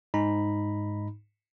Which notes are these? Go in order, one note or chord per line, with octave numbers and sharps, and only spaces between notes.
G#2 D#4 A#5 B5